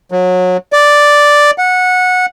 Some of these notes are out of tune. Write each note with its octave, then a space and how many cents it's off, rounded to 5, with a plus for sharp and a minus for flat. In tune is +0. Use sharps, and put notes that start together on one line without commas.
F#3 -25
D5 +0
F#5 -15